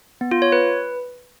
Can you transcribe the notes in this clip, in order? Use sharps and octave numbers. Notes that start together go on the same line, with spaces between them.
B3
F4
C#5
B4